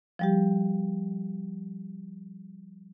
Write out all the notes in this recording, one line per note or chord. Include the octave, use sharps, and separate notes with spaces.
F3 G3 G4